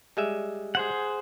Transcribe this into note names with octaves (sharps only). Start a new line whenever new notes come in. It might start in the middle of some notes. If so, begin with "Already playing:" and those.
G3 G#3 E5
G#4 C5 F#5